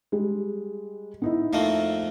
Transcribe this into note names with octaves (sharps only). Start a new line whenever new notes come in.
G3 G#3
B3 D#4 E4
F2 A3 A#3